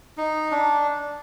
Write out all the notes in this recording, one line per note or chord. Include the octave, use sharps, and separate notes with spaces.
D#4
D4